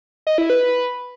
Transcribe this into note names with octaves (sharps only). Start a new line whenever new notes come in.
D#5
E4
B4